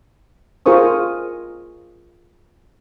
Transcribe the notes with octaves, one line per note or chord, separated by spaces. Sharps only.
F4 G#4 A#4 C5 C#6 D#6